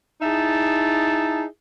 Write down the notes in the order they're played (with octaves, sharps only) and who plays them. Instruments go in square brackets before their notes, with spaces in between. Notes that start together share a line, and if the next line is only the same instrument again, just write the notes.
[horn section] D#4 E4 G#4 E5 A5